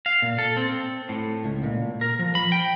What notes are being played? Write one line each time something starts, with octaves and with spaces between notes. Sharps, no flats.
F5
A#2
A4
C4
A2
C#2
A#2
A#4
F3
B5
G5